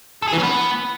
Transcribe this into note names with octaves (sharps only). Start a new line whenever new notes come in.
A4
G#4
E3
C#4
B3